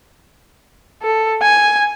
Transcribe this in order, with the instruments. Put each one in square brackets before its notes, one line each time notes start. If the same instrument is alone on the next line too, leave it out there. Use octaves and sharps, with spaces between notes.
[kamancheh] A4
G#5